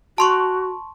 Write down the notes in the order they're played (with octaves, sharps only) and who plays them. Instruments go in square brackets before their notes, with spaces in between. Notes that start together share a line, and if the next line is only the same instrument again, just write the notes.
[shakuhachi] F#4 [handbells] A5 C6 C#6